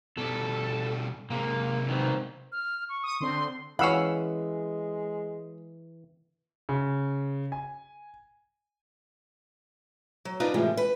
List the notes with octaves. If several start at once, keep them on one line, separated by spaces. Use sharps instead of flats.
B2 G3 A4
C3 G#3 A#3
D#3 B3 C4
F6
C#6
D#6
D3 C4 C6
E3 G#3 C#4 F5 F#5 B5 E6
C#3
G#5
F#3
D4 D#4 F4 A#4 B4 A#5
A2 C3 E3 F3 G3 G#3
B4